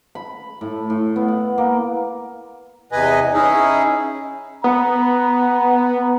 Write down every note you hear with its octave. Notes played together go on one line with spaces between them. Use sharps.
B5
A2
A2
B3
F#5
A#3
E2 C3 B4 D#5 G#5
C#4 D#4 E4 G#4
B3 A#5